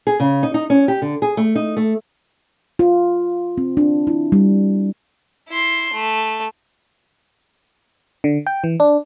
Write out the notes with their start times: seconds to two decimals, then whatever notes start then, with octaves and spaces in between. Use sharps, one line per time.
0.07 G#4
0.20 C#3
0.43 D#4
0.54 D#4
0.70 C#4
0.88 G4
1.02 D3
1.22 G#4
1.37 A3
1.55 D#4
1.77 A3
2.79 F4
3.58 C4
3.77 D4
4.07 E4
4.32 G3
5.49 E4 C6
5.93 A3
8.24 D3
8.47 G5
8.64 E3
8.80 D4